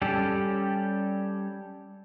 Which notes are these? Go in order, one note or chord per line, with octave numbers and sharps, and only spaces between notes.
G3 C#4 G4 A4